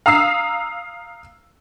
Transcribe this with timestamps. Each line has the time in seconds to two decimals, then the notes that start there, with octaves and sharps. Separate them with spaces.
0.06 F5 A#5 D#6 E6 C7